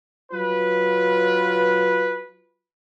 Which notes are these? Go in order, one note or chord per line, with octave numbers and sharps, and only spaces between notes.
F#3 F4 B4